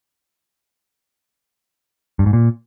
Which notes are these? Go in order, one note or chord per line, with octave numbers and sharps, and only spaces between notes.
G2
G#2
A#2